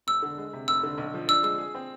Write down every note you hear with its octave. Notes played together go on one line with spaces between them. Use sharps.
E1 E6
D3
G#3
C3
F1 E6
D3
B1
F3
D4 E6
G#3 E6
G#4
C4